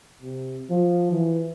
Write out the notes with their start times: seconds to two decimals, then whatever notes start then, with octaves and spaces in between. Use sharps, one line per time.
0.21 C3
0.70 F3
1.12 E3